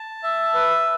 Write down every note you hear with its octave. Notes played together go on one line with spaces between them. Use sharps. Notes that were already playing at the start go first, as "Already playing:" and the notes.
Already playing: A5
E5
B4